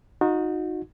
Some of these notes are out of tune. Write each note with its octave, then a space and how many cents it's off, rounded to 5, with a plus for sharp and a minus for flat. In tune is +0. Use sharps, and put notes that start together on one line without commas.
D#4 +0 F#4 -35